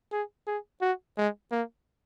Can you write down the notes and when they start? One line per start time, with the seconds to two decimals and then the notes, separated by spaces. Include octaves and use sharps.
0.12 G#4
0.47 G#4
0.82 F#4
1.18 G#3
1.52 A#3